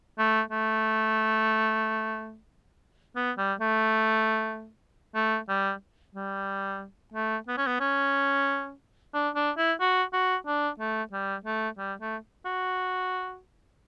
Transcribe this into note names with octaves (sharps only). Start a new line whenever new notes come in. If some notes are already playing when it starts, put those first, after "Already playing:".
A3
A3
B3
G3
A3
A3
G3
G3
A3
B3
C#4
B3
C#4
D4
D4
E4
F#4
F#4
D4
A3
G3
A3
G3
A3
F#4